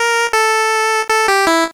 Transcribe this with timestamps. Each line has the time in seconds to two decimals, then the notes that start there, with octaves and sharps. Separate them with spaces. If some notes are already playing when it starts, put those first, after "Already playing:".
Already playing: A#4
0.33 A4
1.09 A4
1.28 G4
1.47 E4